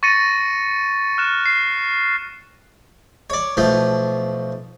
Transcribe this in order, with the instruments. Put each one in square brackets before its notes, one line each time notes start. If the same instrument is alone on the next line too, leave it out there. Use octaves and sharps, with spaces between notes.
[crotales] C#6 A6 A#6 C#7 D#7
F6 F#6 E7
C7
[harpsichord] C#5 D5
B1 F3 A3